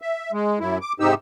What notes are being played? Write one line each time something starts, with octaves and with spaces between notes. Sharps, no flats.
E5
G#3
F#2 E4
D6
G#2 C3 D#4 G4 E6